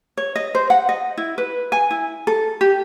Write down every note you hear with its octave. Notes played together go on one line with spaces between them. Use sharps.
C#5
D#5
C5
F#5
D#5
E4
B4
G#5
E4
A4
G4